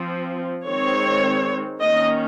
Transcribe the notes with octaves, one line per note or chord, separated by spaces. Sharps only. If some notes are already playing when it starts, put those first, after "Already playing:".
Already playing: F3 C4
D#3 G#3 C4 C#5
D#3 A#3 C#4 D#5